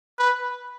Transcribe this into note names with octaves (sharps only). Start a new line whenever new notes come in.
B4